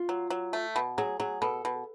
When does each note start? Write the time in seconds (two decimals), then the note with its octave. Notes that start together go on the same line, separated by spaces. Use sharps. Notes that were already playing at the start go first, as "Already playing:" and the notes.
Already playing: F4
0.09 F#3
0.30 F#3
0.53 A3
0.76 B2
0.98 F#3 G#4
1.20 F#3 G#4
1.42 B2 A4
1.65 B2